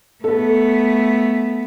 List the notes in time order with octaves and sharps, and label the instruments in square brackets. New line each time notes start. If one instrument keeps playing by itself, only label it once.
[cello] A3 B3 [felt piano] A4